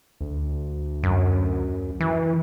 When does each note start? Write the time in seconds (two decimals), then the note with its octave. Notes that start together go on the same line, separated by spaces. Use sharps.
0.21 D2
1.04 F#2
2.00 E3